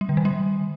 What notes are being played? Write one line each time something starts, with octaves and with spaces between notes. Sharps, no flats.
G3
D3
D#3
G3